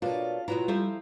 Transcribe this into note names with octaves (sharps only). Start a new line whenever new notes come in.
B2 A#3 D4 F4 A4 C#5
B2 F#3 B3 E4 F4 A#5
F3 G3 A3 C4